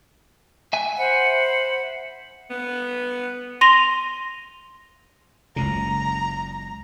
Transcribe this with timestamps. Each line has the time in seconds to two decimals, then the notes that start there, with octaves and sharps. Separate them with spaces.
0.73 E5 G#5
0.98 C5 F#5 B5
2.50 B3
3.61 C6 A#6 D#7 F7 G7
5.56 F#1 C#2 C#3 A#5